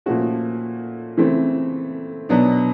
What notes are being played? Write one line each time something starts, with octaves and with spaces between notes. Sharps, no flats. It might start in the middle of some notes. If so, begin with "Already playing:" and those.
A#2 F3 A3 C#4 F#4
C#3 E3 A3 C4
B2 F#3 B3 D4